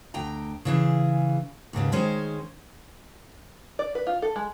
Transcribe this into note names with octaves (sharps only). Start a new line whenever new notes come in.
D2 G5 A#5
C#3 E3 G#4
D#2 G#2 C#3 B3
D#3 G#3 C#4 C5
D5
B4
F4
A4
G#3